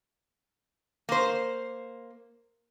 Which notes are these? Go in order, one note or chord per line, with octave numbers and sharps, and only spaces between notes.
A#3 C5